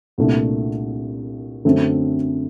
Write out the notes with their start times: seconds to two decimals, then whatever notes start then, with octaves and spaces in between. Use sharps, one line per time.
0.18 C2 A#2 A3 D4
1.65 F#2 D3 A3 C4